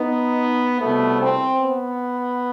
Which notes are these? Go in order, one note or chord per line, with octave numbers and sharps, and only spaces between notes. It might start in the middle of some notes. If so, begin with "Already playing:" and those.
Already playing: B3 D#4
C2 B2 A3 B3
C4
B3